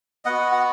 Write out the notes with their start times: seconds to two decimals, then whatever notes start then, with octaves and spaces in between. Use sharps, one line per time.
0.25 B3 F#4 D#5 F#5
0.52 F#5